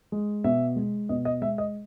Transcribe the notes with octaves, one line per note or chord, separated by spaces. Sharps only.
G#3
B2 E5
G#3
B2 D#5
D#5
G#3 E5
D#5